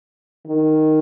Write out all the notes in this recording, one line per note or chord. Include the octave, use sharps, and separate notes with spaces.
D#3